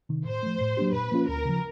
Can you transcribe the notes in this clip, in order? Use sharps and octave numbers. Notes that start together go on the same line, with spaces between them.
C3 D#3
A2 C5
F3 A3
A2
F#3 A#3 D4 G4
A#2 B4
F3 A#3 C#4 F4
D2 A#4
C#3 F3